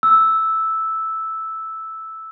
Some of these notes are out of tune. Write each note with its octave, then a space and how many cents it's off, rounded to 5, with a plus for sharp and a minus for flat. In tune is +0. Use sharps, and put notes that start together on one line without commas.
E6 -5